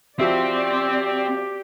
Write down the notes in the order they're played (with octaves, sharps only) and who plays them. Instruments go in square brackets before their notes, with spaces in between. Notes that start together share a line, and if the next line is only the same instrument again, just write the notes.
[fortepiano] F3 F#4 E5 [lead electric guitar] C4 [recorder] G4 [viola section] D5